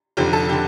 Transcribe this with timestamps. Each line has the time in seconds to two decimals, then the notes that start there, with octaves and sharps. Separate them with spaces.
0.17 F1 F2 D3 G4
0.33 A4
0.49 D3 G4